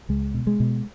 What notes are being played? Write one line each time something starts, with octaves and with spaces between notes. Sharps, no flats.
C#2 G#3
B2
G#3
B2